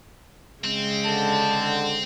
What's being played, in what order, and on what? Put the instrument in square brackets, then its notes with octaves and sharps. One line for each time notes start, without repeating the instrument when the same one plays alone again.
[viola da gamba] C#3 G#3 [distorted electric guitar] C4
[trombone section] D3 [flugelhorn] A5